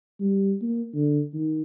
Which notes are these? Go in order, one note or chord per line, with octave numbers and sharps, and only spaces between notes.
G3
A#3
D3
D#3